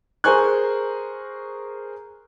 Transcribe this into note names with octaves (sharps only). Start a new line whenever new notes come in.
G#4 A#4 C5 G#5 C#6 F#6